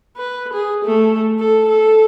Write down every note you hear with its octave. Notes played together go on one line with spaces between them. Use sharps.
B4
G#4
A3
A4
A4